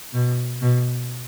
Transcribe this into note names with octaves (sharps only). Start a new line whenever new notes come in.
B2
B2